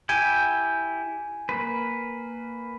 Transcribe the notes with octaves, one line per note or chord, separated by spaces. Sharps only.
E4 G4 G5 G#5
A#3 B4